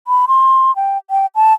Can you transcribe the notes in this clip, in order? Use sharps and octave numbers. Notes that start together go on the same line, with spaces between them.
B5
C6
G5
G5
A5